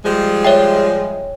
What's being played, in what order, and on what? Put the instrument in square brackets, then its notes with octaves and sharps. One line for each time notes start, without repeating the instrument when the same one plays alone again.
[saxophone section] F3 G3 G#3
[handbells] C#5 E5 G5